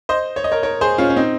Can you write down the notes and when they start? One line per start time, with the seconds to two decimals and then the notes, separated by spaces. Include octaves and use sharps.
0.09 C5 D#5
0.36 C#5
0.44 D#5
0.52 A#4 C#5
0.63 A#4 C#5
0.81 G#4 C5
0.98 C#4 F4
1.10 C#4
1.16 C4 D#4